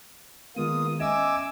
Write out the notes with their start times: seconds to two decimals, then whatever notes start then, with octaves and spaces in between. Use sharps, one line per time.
0.56 D#3 G#3 A#3 B3 F4 D#6
1.00 C#4 D#5 E5 G#5 D6 E6